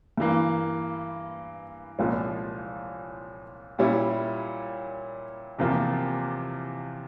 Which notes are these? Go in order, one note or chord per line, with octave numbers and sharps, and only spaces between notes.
G2 E3 A#3
C2 A#2 F3 G#3 C#4
A#2 G3 C#4 E4
E2 C3 F3 A#3 F4